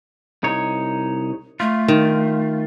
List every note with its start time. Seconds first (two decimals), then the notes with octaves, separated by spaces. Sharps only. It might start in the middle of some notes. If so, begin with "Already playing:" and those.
0.44 C2 D#4 C#5
1.60 A3 F4
1.88 D#3